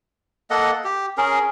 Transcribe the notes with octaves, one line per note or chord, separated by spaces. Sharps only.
A#3 A4 D#5 F#5
G4
C#4 G#4 A#4